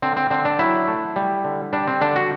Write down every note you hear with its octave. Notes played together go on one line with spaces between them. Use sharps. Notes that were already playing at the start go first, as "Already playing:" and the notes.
D3 C4
C4
D3 C4
D4
F#3 E4
A3
G3
D3
G3 D4
C4
D3 D4
F#4